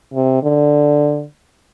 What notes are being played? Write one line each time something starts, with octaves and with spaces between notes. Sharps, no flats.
C3
D3